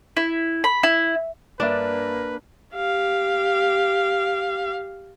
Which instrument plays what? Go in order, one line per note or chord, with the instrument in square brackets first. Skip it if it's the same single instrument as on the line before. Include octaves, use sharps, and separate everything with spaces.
[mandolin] E4
B5
E4
[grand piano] G2 D5 E5 [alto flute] A#3 [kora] D4 [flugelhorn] B4
[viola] G4 F5